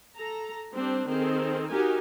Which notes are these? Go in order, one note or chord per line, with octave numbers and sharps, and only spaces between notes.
A4 A#5
G3 C4 D4
D#3 C4 G#4 A4
D#4 F#4 G4 A#4 G#5